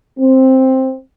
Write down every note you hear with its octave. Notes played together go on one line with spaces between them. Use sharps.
C4